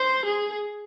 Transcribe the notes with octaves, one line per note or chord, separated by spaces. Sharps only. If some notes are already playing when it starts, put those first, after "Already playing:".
Already playing: C5
G#4